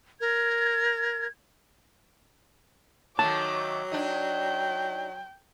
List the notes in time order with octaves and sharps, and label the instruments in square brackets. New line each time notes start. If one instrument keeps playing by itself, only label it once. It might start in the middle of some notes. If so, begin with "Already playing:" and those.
[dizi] A#4 [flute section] G#6
[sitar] D#3 A3 [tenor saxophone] F#3 [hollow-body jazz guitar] A5 [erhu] D6
[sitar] D4 D#4 [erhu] G5